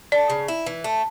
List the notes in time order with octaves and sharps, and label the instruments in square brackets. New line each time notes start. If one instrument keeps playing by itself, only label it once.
[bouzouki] A3 [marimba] D5
[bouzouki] C#3
E4
E3
A3